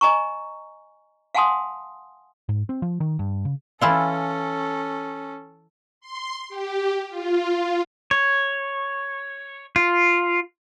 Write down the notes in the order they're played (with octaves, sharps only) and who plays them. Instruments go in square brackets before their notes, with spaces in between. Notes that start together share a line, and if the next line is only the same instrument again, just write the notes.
[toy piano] D#5 G#5 A#5 C#6
F5 F#5 G#5 A5 C6 D#6
[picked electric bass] G#2
C4
F3
D#3
G2
C#3
[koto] E3 E4 F4 [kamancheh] C#4 A4
[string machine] C6
G4
F4
[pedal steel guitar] C#5
F4